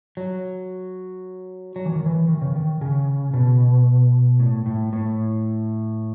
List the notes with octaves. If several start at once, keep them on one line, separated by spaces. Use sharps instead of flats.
F#3
F#3
E3
D#3
E3
D#3
C#3
D#3
C#3
B2
A2
A2
A2